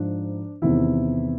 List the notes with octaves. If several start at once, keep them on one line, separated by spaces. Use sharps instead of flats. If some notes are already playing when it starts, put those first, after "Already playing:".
Already playing: G#2 F3 D4
E2 C3 D#3 E4 E5